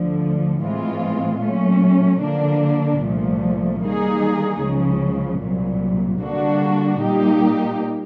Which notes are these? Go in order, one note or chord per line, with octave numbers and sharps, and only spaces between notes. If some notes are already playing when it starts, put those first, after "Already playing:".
Already playing: D2 D3 F3
A2 E3 G#3 C4 F4
A#2 F#3 A3 C#4
D3 F3 A#3 D4
C2 A#2 F3 A3
D#3 G3 A#3 D#4 G#4
C#2 C#3 F3
C2 A#2 F#3
D3 G3 A#3 D4 F#4
A#2 G3 A#3 D#4 G4